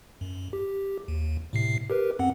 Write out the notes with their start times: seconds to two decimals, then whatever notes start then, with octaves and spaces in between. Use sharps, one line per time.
0.21 F#2
0.53 G4
1.08 D#2
1.53 A2 C3 C7
1.90 G4 A#4 B4
2.19 F#2 C4 F#5